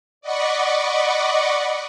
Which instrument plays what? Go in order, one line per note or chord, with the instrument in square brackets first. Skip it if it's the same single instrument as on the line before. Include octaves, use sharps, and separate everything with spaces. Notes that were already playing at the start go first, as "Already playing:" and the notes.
[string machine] D5 D#5 F#5 B5 C#6 D6